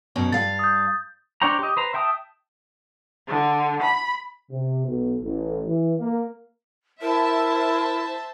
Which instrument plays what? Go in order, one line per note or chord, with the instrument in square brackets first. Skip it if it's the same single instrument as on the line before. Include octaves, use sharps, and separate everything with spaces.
[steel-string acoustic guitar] F#2 B2 C#4
[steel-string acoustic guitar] G2 F5 [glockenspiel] A6
[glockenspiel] D#6 G6
[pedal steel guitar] D4 C5 C#5 G5 A#5
G4 D#5
B4 C5 A#5
E5 G5 A5 D#6
[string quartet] D3
B5
[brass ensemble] C3
B1
A1
E3
A#3
[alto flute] E4 [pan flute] A#4 [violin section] C5 E5 A5